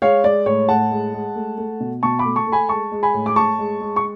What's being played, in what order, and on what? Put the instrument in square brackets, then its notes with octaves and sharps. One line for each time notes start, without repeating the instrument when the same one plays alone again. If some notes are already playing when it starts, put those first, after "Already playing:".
[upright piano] G#3 C#5 F5
G#3 D5
A2 C#5
A2 F#5 A5
G#3
G#3
A3
A3
B2
B2 A5 C#6
B5 D6
A3
A5 C#6
A3
G#5 B5
G#3 A5 C#6
G#3
G#5 B5
A2
D6
A2 A5 C#6
G#3
G#3
C#6